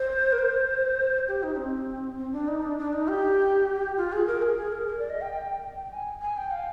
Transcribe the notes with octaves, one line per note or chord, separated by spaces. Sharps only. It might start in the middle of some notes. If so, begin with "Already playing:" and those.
Already playing: C5
A#4
C5
G4
D#4
D4
C4
C4
D4
D#4
D4
D4
D#4
G4
F4
G#4
A#4
G#4
G#4
A#4
A#4
D5
D#5
G5
G5
G#5
G#5
G5
F5